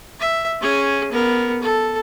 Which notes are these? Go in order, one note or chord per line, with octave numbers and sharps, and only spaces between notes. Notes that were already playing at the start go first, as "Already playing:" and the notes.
E5
C#4 G#4
B3 A#4
A4